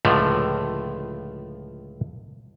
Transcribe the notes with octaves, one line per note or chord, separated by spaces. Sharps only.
C#2 A2 D3 F3 A3